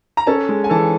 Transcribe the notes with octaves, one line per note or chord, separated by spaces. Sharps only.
A#5
C#4 A4 A5
G#3
G#5
E3 A4 A5